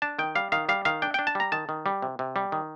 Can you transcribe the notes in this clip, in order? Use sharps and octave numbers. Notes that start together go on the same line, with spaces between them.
D4 A5
D#3 G5
G3 F5
D#3 F5
G3 F5
D#3 F5
D4 G5
D4 G5
A5
G3 A#5
D#3 A5
D#3
G3
C3
C3
G3
D#3